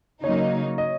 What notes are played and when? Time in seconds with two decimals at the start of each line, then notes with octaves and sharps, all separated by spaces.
0.24 C#3 F#3 A#3 D#4 C#5
0.78 D#5